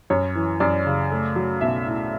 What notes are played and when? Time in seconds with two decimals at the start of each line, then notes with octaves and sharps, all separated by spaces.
0.10 F#2 C#5
0.35 E3
0.60 F#2 D5
0.86 C#3
1.11 A3
1.36 F#3
1.61 B1 E5
1.87 A2